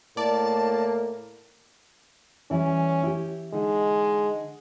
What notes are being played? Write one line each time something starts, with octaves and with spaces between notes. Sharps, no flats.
A2 A#3 D5 A5
E3 G3 C#4
E4 G4
D3 G#3 D#4